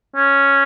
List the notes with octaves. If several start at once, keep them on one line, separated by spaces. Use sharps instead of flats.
C#4